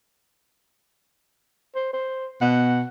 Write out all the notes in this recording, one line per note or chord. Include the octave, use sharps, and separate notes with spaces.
C5
C5
B2 F#5